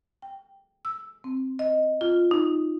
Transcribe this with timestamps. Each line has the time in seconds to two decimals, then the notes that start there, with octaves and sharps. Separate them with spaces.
0.22 G5
0.85 E6
1.24 C4
1.59 D#5
2.01 F4
2.31 D#4